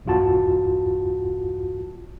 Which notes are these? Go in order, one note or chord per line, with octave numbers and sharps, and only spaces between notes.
B1 E2 G2 F4 F#4 A5